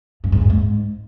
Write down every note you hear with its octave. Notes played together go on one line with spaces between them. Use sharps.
G2
G#2
F#2
G#2